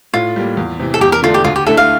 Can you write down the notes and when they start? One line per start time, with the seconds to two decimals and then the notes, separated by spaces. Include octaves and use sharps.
0.14 A2 F4
0.36 G3 A#3
0.57 E2
0.80 C3 E3
0.94 A4
1.01 E2 G4
1.12 A#4
1.23 D3 A3 D4 F4
1.34 G4
1.44 D2 F4
1.56 G4
1.66 D3 A3 E4 A4
1.77 F5